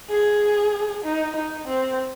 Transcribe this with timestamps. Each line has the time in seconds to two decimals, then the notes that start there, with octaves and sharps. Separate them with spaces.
0.09 G#4
1.04 D#4
1.36 D#4
1.67 C4